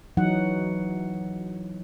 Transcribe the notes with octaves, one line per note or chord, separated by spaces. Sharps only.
E3 F#3 D#4 F#5